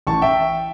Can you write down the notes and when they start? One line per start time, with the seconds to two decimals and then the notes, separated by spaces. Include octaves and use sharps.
0.07 A1 A5 C#6
0.22 E5 G5